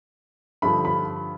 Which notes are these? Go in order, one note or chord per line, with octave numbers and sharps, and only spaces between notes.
G2 D3 F3 B5
B5